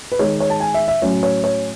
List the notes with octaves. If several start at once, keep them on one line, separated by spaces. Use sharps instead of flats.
B4
D#3 G#3 D#4 C#5
C#5
A5
G#5
E5
E5
A2 F#3 C#4 C#5
C#5
C#5